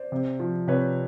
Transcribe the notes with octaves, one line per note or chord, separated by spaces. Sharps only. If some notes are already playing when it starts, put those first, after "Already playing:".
Already playing: C5 D5
C3
F3
C3 B4 C#5